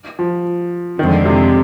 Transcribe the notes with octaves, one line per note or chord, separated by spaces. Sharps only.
F3
F2 D3 D#3 G#3 C4
C3